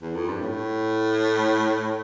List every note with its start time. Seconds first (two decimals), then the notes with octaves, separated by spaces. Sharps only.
0.01 E2
0.14 F2
0.29 G2
0.42 A2